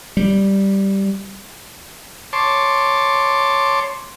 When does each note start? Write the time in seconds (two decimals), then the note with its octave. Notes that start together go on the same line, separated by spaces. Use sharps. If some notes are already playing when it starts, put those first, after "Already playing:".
0.17 G3
2.33 C#5 A5 C6 D6